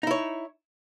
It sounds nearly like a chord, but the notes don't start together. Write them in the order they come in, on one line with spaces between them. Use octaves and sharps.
D#4 E4 C#5